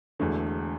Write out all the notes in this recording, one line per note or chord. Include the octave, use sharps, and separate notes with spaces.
E1 E2 D3 A3